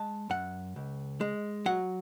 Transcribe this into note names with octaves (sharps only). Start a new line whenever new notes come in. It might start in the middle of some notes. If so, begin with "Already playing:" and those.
Already playing: G#3 A5
F#2 F#5
C#2
G#3
F#3 F#5